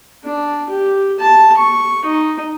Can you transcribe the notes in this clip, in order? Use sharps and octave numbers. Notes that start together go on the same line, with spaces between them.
D4
G4
A5
C#6
D#4